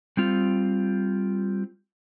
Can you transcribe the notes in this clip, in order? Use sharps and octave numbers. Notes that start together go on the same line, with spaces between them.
G3 C4 F4